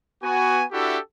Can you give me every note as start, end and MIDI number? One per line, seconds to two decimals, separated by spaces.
0.22 0.63 59
0.22 0.63 66
0.22 0.63 80
0.72 0.97 62
0.72 0.97 64
0.72 0.97 66
0.72 0.97 67
0.72 0.97 69
0.72 0.97 76